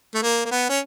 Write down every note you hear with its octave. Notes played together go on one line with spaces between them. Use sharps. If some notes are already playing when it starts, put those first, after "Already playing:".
A3
A#3
A#3
B3
C#4